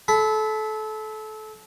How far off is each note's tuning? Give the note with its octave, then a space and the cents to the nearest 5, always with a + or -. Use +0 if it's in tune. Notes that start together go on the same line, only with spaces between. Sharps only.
A4 -25 B5 +15